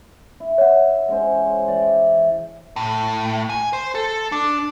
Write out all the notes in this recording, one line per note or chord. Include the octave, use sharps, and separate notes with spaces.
E4
C#5 E5 F#5
G#3 C#4 C5
E3 D5 G5
A2
G#5
C5
A4
D4